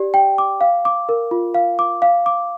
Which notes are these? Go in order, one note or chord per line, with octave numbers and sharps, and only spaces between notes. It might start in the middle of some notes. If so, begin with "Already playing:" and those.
Already playing: G4 D5
G5
D6
F5
D6
A#4
F4
F5
D6
F5
D6